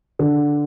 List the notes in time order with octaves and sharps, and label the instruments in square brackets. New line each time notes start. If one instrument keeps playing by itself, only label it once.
[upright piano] D3